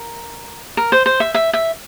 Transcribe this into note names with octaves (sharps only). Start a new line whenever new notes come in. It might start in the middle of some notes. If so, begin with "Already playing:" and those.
Already playing: A#4
A#4
C5
C5
E5
E5
E5